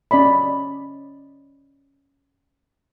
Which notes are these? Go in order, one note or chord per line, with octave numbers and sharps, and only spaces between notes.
C#4 D5 D#5 B5